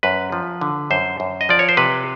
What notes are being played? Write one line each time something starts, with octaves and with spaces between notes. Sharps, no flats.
F#2 B4
F3
D3
F#2 C5
F#2
D#5
F3 D5
C#5
C5
C3 B4